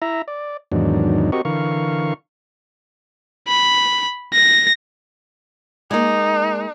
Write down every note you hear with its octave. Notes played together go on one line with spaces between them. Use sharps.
E4 E5 A#5
D5
E2 G#2 D#3 F#3 D4
C4 F#4 G4 A#4 D#5 C#6
D3 E3 A#4 F5 C#6
B5
A#6
G#3 A#3 D#4